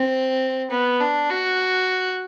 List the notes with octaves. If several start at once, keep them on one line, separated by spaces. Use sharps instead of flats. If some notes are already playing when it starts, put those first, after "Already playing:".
Already playing: C4
B3
D4
F#4